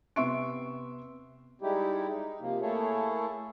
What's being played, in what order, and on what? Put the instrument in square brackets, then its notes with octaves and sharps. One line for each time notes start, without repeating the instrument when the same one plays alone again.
[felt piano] C3 B3 E5 C6 C#6 D7
[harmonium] G3 G#3 D#4 E4 G4
D#4
C3 F3 A#3
A3 A#3 E4 G#4 A4 C#5